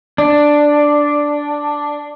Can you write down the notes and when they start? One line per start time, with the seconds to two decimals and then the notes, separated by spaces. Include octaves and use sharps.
0.18 D4